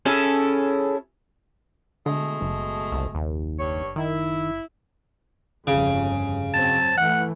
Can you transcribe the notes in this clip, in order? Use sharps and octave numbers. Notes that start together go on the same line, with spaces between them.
C#4 E4 G#4 A4
B2 D3 G#3 A3
F#1
C2
D#2
G2 C#5
D#3 E4
G1 F2 C#3
F#3 C4 A5
E3 A3 F#5